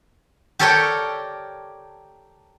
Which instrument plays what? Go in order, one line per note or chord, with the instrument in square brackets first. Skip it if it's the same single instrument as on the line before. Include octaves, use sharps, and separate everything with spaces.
[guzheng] G4 A4 A#4 C#5 D5 G5